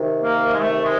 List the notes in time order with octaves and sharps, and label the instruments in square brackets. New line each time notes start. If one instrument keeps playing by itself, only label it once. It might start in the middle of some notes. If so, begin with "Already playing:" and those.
Already playing: [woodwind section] C3 D#3
A#3
G#3
A3
G#3